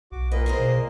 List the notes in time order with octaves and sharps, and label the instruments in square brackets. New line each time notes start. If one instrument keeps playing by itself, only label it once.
[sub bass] B1 [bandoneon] F#4 D6
[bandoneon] A#2 A#3 D#5 [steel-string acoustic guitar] B4
[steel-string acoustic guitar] G#4 A#4 C5
[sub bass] B2